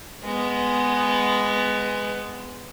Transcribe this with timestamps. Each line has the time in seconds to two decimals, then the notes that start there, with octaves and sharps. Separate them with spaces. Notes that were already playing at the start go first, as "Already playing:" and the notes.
0.24 G#3 B3